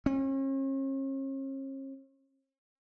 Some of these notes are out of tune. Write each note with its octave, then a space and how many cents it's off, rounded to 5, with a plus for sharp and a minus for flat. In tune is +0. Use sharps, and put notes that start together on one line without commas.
C#4 -45